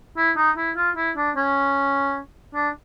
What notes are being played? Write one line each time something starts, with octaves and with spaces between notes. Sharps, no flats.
E4
D#4
E4
F4
E4
D4
C#4
D4